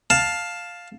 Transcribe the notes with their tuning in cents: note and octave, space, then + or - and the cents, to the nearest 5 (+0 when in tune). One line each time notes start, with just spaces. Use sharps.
F5 +10 A5 +0